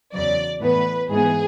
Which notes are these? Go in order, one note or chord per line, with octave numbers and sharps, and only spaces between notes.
E2 C#3 F#3 D5
A2 E3 B3 B4
G#2 E3 G#3 B3 G#4